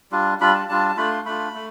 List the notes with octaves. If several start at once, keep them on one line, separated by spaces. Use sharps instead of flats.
G3 D4 F4
G3 D4 F4 B5
A5
G3 D4 F4 A5
A5
A3 D4 F4 B5
C6
A3 D4 F4 B5
A3